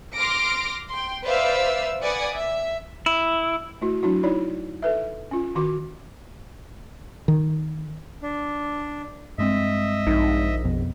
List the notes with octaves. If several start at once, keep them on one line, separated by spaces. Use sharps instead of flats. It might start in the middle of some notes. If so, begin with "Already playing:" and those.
C6 D6 F6 A#6 D7
G5 C6
B4 C5 D5 E5 F5 E6
B4 D5 F#5 G#5 D#6
E5
E4
A3 E4 F#4
F#3 D4 E4 F#4
D#4 E4 C#5 D5
A4 B4 E5
C#4 F4
D#3 F#4 D6
D#3
D4
G2 G#3 C4 D#5 E5
A#1 D#4
F2 B2